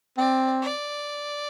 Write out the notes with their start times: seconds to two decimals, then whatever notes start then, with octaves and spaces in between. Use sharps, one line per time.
0.17 C4 D5
0.62 D5